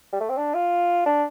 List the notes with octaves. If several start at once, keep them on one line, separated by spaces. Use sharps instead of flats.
G3
A3
C4
D4
F4
D4